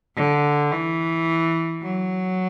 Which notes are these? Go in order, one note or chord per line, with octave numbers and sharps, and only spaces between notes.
D3
E3
F#3